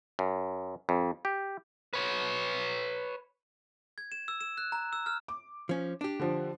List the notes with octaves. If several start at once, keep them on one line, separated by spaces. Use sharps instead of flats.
F#2
F2
G4
B4 C#5
G#6
E7
E6
E7
F#6
A#5
E6
F6
D6
F3 C#4
D4 G4
D3 F3